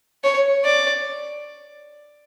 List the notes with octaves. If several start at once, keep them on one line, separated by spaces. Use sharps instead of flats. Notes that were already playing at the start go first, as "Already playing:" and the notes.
C#5
D5